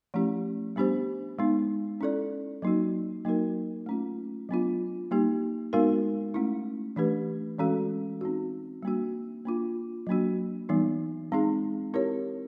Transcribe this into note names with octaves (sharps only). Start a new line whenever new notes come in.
F3 A3 C#4 E4 G4
G3 B3 D4 G4 C5
G#3 B3 D#4
C#4 E4 A4 D5
F#3 A#3 D#4 F#4
F#3 A#3 D#4 F#4 A#4
A3 C#4 F4
F#3 B3 D4 F4
G3 A#3 D#4 G4
G#3 B3 D#4 F#4 A#4
A3 C#4 E4
E3 A3 D4 G4 B4
E3 G#3 C#4 F#4 A4
C4 D#4 F#4
G3 A#3 D4 F#4
A#3 D4 F4
F#3 A#3 D4 F#4
E3 G3 B3 D#4
G#3 C4 D#4 G#4
C4 E4 G4 A#4 C#5